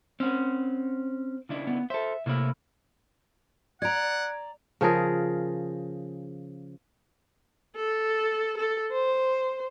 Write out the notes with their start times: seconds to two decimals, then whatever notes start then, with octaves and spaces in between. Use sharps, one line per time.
0.20 C4 C#4 F#5
1.49 C#3 D4 E4
1.67 B3
1.90 A4 C5 E5
2.26 A2 C3 A#3 E4
3.82 D5 F#5 A#5 G#6 D7
4.81 C#3 F3 G#4 A#4
7.76 A4
8.57 A4
8.92 C5